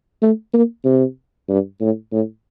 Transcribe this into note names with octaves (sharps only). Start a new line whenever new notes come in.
A3
A#3
C3
G2
A2
A2